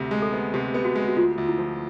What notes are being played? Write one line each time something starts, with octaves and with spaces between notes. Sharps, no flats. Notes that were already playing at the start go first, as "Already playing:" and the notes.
Already playing: D2 C3
G#3
A4
B3
C3 G4
B3
F#4
G#3
F#4
D2 F4
D2
E4
F3